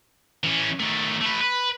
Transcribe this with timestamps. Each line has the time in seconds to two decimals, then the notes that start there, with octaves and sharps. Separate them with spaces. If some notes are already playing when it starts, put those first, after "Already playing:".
0.44 E3 C#4
0.79 D#3 A3
1.21 A3 B4
1.41 B4